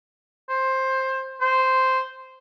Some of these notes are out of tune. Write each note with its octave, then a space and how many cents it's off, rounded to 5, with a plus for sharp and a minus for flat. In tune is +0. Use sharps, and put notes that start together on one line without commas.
C5 +15
C5 -5